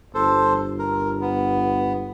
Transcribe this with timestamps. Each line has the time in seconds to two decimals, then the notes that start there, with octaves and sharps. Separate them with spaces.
0.15 G1 A4 C5
0.79 A#4
1.21 B3